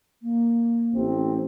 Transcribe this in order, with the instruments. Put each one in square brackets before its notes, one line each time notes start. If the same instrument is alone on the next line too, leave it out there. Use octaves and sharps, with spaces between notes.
[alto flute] A#3
[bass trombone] A1 [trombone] C4